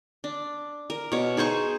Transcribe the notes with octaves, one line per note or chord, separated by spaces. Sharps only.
D4
A#4
B2 C#5
D#4 G#4 C5 C#6